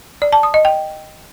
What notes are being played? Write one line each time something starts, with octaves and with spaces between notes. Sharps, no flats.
D5
A5
D#6
D#5
G5